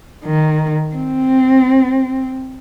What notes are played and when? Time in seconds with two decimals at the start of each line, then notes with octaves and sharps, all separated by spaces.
0.24 D#3
0.95 C4